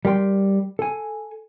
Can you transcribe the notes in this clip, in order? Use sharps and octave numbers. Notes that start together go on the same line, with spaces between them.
G3 A#4 G5 C6
A4 G#5